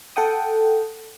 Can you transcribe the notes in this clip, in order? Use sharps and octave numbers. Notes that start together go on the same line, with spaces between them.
A4 F#5 G5 D#6